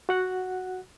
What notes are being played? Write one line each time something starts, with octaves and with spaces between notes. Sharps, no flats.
F#4 F#5 F#6